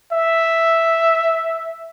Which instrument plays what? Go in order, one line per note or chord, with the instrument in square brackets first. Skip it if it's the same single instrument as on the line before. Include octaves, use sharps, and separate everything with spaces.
[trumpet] E5